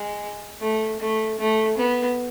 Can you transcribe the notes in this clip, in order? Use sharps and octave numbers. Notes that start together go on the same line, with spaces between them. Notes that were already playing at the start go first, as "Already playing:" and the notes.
Already playing: G#3
A3
A3
A3
B3